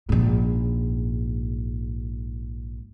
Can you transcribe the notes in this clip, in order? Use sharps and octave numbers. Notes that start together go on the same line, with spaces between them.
A#1 G#2